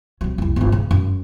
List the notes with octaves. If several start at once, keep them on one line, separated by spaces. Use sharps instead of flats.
C3 F#3
F1 C2
G1 F4
C#3
F#2